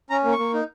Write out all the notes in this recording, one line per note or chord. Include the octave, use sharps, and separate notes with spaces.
C#4 A#5
A#3
C#6
A#3
D#4